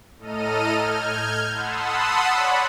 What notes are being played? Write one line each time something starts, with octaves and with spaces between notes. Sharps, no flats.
A2 A4 D#5 A#5 F6 D#7
F6 G6 G#6
F#5 A5 B5 C6 D#6 E6
C#5 D5 F#5 B5 C#6